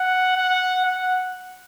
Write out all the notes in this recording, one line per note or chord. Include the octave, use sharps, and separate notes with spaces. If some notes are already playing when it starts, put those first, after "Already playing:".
Already playing: F#5
F#5
F#5